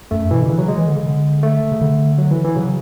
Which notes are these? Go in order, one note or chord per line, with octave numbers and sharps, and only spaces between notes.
F#2 A3
B2 E3
D3
C#3 E3
F#3
G#3
E3
D3
C#3
D3
A3
C#3
D3
F#3
E3
E3
C#3 F#3